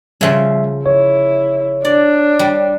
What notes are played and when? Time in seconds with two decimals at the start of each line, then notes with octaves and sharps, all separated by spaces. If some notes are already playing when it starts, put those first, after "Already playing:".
0.21 C#3 F3 G3 E5
0.86 G1 E4 C#5
1.85 D4 D5
2.39 G3